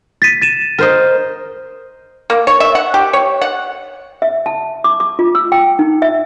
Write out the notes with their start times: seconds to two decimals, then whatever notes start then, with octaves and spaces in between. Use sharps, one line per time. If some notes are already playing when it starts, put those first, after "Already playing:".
0.22 A6 B6 D#7
0.42 A6 D#7 E7
0.78 A#4 C5 D#5
2.30 A#3
2.47 C#5
2.60 E5
2.75 F#5
2.94 G4
3.13 C#5
3.42 F#5
4.22 E5
4.46 A5
4.84 D6
5.00 D6
5.19 F4
5.35 E6
5.52 G5
5.79 D#4
6.02 E5